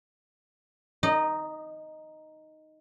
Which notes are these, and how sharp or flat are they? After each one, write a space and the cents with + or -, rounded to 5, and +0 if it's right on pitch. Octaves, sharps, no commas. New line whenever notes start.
D#4 +0 D#5 -30